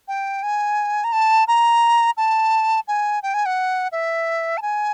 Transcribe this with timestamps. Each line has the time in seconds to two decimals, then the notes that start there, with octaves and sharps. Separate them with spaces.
0.08 G5
0.43 G#5
1.04 A#5
1.13 A5
1.48 A#5
2.17 A5
2.88 G#5
3.23 G5
3.34 G#5
3.46 F#5
3.92 E5
4.57 A5
4.62 G#5